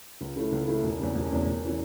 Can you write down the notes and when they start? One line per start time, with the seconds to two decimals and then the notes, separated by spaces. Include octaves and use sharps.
0.21 C#2
0.36 C#3 A3 E4
0.52 C#2
0.68 C#3 A3 E4
0.83 E1
1.00 E2 C#3
1.15 E1
1.31 E2 C#3
1.46 E1
1.64 E3 C#4